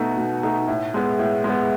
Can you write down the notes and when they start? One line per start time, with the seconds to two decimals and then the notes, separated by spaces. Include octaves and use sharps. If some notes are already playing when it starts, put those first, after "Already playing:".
Already playing: B2 A3 D#4 F#4
0.17 B2
0.43 A3 D#4 F#4
0.68 A2
0.94 G#3 B3
1.19 A2
1.44 G#3 B3